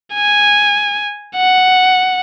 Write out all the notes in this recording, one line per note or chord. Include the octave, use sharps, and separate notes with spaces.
G#5
F#5